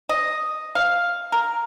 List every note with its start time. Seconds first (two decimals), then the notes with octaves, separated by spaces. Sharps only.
0.09 D#5
0.75 F5
1.32 A#4